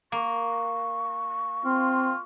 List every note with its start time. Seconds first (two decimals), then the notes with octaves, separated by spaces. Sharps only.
0.12 A#3 C#6
1.65 C4 F4